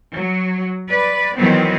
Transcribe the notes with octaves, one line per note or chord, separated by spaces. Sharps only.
F#3
B4 D5
D#3 E3 F#3 B3 C4